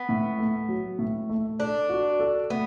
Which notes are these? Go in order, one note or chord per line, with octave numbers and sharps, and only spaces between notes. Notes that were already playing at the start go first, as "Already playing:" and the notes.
Already playing: B3
A2
A3
F#3
A2
A3
D4 A4
F#4
A4
A3 B3